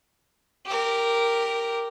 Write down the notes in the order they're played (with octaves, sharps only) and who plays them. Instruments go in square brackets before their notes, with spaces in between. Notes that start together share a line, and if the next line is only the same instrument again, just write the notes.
[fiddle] G4 A#4